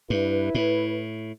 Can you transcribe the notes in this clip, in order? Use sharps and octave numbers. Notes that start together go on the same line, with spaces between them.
G2 E4 B4
A2